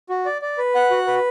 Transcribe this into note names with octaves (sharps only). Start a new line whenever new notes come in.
F#4
D5
D5
B4
F#5
F#4
B4